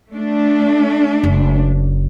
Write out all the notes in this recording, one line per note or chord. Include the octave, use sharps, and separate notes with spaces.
A3 D4
F#1